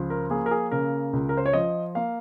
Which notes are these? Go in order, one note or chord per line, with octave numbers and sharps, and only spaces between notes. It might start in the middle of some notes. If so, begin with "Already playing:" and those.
Already playing: C#2 F3
A#4
A#3 G#4
A#4
G#4
C#3 A#4
C#2
A#4
C5
C#5
F3 D#5
A#3 F5